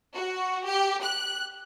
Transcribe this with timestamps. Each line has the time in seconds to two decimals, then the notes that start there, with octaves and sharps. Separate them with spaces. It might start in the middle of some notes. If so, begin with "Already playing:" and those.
0.15 F#4
0.65 G4
1.03 F#6